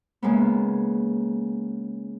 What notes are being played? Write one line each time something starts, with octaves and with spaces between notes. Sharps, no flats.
C#3 G#3 A#3 B3